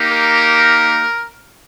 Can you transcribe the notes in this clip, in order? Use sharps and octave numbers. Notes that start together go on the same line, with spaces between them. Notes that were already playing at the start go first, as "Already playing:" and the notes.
Already playing: A#3 D#4 G4
A#4